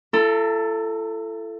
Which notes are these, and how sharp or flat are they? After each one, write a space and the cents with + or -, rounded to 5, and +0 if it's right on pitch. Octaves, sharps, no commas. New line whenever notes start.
E4 +40 A4 +5 A#5 -30